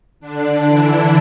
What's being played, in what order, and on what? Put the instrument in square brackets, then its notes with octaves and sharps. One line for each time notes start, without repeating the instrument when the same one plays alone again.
[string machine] D3 D4
E3 E4